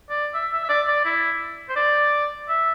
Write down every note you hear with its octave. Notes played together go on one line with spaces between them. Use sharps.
D5
E5
E5
E5
D5
D5
E4
C5
D5
E5